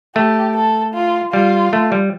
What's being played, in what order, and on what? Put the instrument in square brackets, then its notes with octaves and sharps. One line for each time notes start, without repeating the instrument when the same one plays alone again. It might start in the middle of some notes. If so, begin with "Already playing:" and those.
[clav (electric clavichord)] A3 [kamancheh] G4
[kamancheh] A4
F4
[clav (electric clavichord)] G3 [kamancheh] F4
[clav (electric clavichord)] A3
G3